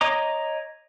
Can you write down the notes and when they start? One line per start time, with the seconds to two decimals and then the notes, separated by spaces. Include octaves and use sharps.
0.01 C#5 D#5 A#5 D6 D#6